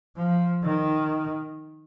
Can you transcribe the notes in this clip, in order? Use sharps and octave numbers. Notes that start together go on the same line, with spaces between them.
F3
D#3